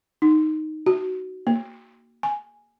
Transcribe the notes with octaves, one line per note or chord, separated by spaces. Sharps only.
D#4
F#4
A#3
G#5